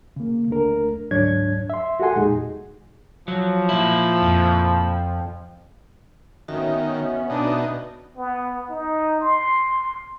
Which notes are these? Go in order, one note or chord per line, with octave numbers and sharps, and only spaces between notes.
C#3 A#3
D2 A3 D4 A#4
D2 G#2 F#3 D4 C#5 G#6
E5 C6
F#4 G4 A4 F#5 G#5 C6
E2 A#2 G#3 D#4 G4 G#4
F3 F#3
A#2 E4
F2
D#3 B3 C#4 F#4 E5
B2 D4 D#4
B3
D#4
C6